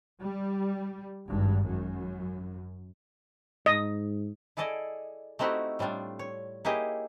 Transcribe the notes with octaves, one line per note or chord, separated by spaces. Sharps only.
G3
G#1 G2
F#2
G#2 D#5
E4 G#4 A4 D5 D#5
A3 C4 D#4 E4 F#4 G4
A2 G3 A3 D4 F4
C#5
A#3 D#4 E4 G4 G#4 D#5